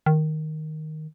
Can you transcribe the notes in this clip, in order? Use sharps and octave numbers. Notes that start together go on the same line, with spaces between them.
D#3